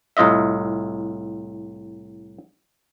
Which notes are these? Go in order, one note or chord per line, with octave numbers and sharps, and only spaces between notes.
C2 A2 F4 D#5 E5